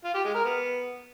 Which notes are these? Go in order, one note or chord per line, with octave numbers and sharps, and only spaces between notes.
F4
G4
G#3
A#4
B3